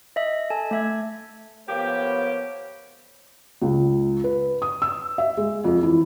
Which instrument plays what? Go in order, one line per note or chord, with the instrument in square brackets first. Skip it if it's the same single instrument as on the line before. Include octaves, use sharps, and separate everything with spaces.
[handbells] D#5 E5
A4 G#5 A5
A3 E5 G#6
[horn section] F3 A#3 G4 [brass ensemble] B3 C#5
[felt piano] C#2
B4
D#6
E6
E5
G#3
F2
E3